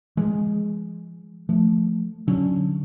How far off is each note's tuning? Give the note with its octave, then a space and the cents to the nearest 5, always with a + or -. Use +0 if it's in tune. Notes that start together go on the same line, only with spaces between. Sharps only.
F3 -40 G#3 +0
F3 +0 A3 +0
D3 +0 F#3 +0 C#4 +0